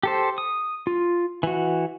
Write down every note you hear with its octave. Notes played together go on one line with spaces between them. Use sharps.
G4 A4 C5
D#6
F4
E3 F#4